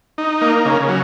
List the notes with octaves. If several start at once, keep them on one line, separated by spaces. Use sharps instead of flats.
D#4
A#3
C#3
F#3